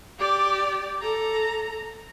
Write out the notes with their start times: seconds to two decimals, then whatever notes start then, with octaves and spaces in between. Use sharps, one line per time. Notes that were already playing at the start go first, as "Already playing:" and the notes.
0.19 G4 D5
1.01 A4 A#5